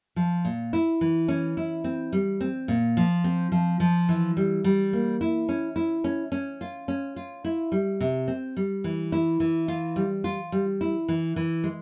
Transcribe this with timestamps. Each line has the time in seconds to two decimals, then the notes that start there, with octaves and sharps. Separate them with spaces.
0.16 F3
0.45 A#2
0.73 E4
1.01 E3
1.28 C#4
1.57 E4
1.84 C4
2.13 G3
2.41 C4
2.68 A#2
2.97 F3
3.24 C4
3.52 F3
3.80 F3
4.09 E3
4.37 G3
4.64 G3
4.93 A#3
5.21 E4
5.49 C#4
5.76 E4
6.04 C#4
6.32 C#4
6.61 F4
6.88 C#4
7.16 F4
7.45 E4
7.72 G3
8.01 C3
8.28 C4
8.57 G3
8.84 E3
9.12 E4
9.40 E3
9.68 F4
9.96 G3
10.24 F4
10.52 G3
10.81 E4
11.09 E3
11.36 E3
11.64 G#3